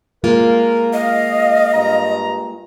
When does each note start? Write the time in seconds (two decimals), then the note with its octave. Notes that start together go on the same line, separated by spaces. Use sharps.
0.24 G#3 A#3 F4 A#4
0.93 D#5 F5
1.74 G2 A#5